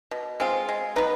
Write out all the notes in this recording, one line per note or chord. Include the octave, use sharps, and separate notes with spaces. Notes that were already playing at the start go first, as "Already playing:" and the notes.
B2
G#3 C4 F4
G#3
B3 D#4 B4